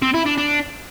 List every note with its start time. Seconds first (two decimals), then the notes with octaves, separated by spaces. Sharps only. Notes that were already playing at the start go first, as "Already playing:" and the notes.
0.02 C4
0.14 E4
0.26 D4
0.37 D4